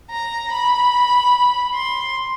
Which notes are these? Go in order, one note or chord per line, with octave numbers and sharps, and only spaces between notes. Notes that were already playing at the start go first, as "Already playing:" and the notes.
A#5
B5
C6